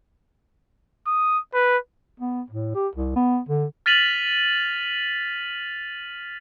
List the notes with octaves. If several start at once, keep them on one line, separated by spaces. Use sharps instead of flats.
D#6
B4
B3
A2
G4
C2
B3
D3
F6 A6 B6 D#7 F7 F#7